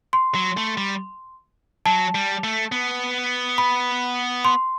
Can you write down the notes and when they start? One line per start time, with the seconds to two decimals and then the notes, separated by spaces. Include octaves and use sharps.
0.13 C6
0.35 F#3
0.57 A3
0.77 G3
1.86 F#3 A5
2.15 G3
2.44 A3
2.72 B3
3.58 B5
4.45 C6